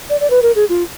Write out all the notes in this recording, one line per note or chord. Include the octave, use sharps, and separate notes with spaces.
D5
D5
B4
A#4
G#4
F4